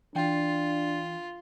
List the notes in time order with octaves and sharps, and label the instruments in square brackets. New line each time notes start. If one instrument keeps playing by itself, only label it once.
[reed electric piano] E3 G5 [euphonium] D4 [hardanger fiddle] F4